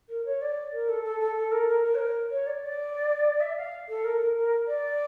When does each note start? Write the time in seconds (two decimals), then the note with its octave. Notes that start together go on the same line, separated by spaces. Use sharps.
0.09 A#4
0.25 C#5
0.41 D5
0.72 A#4
0.89 A4
1.04 A4
1.20 A4
1.36 A4
1.51 A#4
1.67 A#4
1.84 A#4
1.94 C#5
1.98 A#4
2.30 C#5
2.46 D5
2.61 D5
3.40 E5
3.56 F5
3.89 A4
4.04 A#4
4.20 A#4
4.35 A#4
4.67 D5